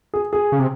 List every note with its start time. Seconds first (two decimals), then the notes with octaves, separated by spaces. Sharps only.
0.14 G#4
0.33 G#4
0.52 C#3
0.59 C3